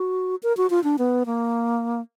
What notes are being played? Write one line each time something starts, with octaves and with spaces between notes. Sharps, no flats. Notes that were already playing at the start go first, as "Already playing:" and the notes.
Already playing: F#4
A#4
F#4
F4
D4
B3
A#3